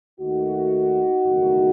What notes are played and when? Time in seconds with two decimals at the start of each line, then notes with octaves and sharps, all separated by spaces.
0.20 D#2 D#3 A3 D#4 F#4
1.24 F#1 E2 D#3 A3